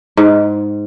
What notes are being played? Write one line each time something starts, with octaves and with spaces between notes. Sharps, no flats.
G#2